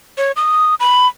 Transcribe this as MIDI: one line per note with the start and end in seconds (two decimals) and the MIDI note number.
0.18 0.32 73
0.36 0.75 87
0.80 1.07 83